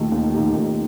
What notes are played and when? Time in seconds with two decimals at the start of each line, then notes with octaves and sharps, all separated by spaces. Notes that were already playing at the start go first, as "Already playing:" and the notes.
Already playing: D#2 D#3 A3 D#4 G4
0.11 D#2
0.33 D#3 A3 D#4 G4
0.56 D#2